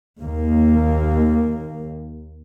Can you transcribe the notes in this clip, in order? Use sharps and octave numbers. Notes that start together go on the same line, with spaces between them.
D#2 A#3